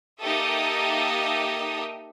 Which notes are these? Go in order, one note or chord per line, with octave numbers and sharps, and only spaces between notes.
A#3 D#4 G4 A4 E5 D#6